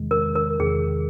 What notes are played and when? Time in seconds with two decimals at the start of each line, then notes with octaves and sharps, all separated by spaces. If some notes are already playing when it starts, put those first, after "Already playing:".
Already playing: E2 C3 D#3 G#3
0.11 A#4
0.35 A#4
0.60 E2 C3 D#3 G#3 G#4